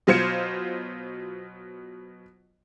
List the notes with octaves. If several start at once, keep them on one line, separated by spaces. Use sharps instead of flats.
B2 F#3 F4 C5 G#6 C#7